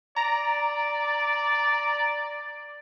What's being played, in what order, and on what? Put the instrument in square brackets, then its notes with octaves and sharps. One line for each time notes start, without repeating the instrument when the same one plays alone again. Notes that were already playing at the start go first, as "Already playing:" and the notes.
[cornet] D5 [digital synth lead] A#5